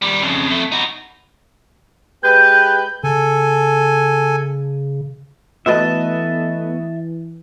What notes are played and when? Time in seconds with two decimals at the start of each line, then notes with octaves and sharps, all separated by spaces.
0.02 D#3 G3
0.22 F2 C#3
0.46 F2 A3
0.72 D#4 F#4
2.23 G#3 G4 B4 G6
3.04 C#3 A4 G#5
5.66 E3 A3 B3 F#4 B4 D#5 E5 A5